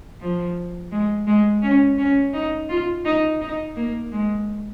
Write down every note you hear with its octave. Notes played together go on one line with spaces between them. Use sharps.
F3
G#3
G#3
C#4
C#4
D#4
F4
D#4
D#4
A#3
G#3